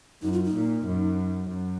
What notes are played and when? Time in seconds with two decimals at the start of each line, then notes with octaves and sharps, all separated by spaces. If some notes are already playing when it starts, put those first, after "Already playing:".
0.22 F#2 D#4
0.33 F4
0.44 D#4
0.54 A#2
0.86 F#2
1.49 F#2